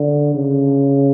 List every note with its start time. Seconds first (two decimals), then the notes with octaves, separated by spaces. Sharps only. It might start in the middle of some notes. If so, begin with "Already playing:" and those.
Already playing: D3
0.35 C#3